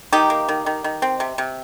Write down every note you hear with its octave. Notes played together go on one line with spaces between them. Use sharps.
D#3 D#4 G4
A#3
D#3
D#3
D#3
C4
C3
C3